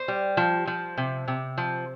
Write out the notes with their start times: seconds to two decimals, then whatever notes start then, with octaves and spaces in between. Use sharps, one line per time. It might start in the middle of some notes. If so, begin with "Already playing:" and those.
Already playing: C5
0.08 G3
0.37 F3
0.67 F3
0.98 C3
1.28 C3
1.58 F3